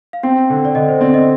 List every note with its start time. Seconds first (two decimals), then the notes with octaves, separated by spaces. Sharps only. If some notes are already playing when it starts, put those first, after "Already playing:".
0.13 F5
0.23 C4 G5
0.50 D3
0.65 D5
0.75 D3 D#5
0.89 C5
1.01 C4 D5
1.14 D#5